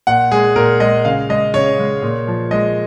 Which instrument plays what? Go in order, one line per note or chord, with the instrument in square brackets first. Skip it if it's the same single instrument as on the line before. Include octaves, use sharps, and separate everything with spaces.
[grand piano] A#2 F#5
G#3 G#4
A#2 A#4
G#3 D#5
C#3 F5
G#3 D#5
C#3 C#5
G#3
A#2
F3
G#3 D#5